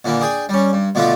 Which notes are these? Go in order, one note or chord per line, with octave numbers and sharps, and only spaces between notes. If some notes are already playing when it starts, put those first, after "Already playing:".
A#2 D3 E3 A#3
D4 G#4 G5 G#5
G3 C#4
G2
B2 D3 F3 A3 D4 F4